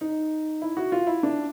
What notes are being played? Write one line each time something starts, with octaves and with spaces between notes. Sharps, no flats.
D#4
E4
F#4
F4
E4
D4